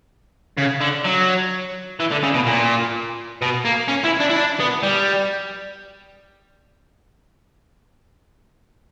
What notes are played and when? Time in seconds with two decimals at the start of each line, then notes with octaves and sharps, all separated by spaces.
0.57 C#3
0.81 D3
1.05 F#3
2.00 E3
2.11 D3
2.23 C#3
2.34 B2
2.46 A#2
3.42 B2
3.65 A#3
3.88 C#4
4.04 E4
4.20 D4
4.30 E4
4.36 D4
4.60 B3
4.83 G3